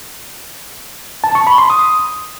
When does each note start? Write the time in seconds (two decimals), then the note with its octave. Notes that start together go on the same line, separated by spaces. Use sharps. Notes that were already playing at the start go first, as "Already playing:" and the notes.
1.24 A5
1.35 C#6
1.47 B5
1.58 C6
1.70 D#6